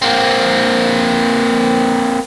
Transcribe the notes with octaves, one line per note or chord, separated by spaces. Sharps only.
A#3 C4